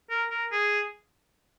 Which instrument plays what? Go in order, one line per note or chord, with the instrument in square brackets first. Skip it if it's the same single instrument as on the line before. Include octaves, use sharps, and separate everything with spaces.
[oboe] A#4
A#4
G#4